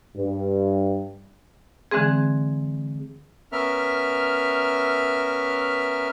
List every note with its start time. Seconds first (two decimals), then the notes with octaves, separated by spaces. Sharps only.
0.16 G2
1.91 D3 E3 G#3 C4 G#4
3.52 B3 C#4 A#4 E5 F6